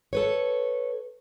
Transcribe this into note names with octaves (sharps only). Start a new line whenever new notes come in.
A4 B4 C#5